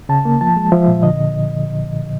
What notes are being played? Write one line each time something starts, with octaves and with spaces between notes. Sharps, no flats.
C#3 A5
A#3
F3 A5
G#3
F3 E5
A#2
D3 D#5